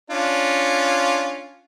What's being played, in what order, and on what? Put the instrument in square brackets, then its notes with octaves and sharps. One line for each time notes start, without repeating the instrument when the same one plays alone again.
[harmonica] C#4 D4 F4